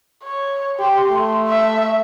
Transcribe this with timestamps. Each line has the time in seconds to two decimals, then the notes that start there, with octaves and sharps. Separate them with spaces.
0.24 C#5
0.79 G4 C6
1.10 A3
1.49 E5